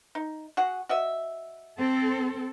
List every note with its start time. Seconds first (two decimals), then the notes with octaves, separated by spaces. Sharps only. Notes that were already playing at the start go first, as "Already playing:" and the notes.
0.15 D#4
0.57 F#4 G#4 F#5
0.89 F#4 D#5 E5
1.77 C4 A4